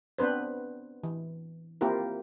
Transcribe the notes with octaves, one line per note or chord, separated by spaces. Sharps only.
B3 C4 D4 B4 C5
E3
A#3 C4 E4 F4 G4 A#4